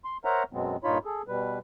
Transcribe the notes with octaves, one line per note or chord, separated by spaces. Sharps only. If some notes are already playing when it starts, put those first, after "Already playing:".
C6
A#4 C5 C#5 E5 F#5 A#5
F#2 B2 F#3 G#3 B3 C4
G2 A#2 D#4 F4 C#5 B5
G#4 A4
B2 G3 B4